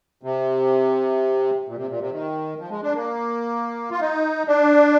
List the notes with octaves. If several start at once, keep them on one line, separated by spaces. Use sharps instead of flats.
C3
A#2
C3
A#2
C3
D#3
F3
G#3
D4
A#3
F4
D#4
D4